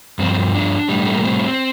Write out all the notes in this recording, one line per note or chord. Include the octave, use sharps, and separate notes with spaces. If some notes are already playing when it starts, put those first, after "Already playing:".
G2 F3 C4
D4
A2 G3
A3
A#3
C4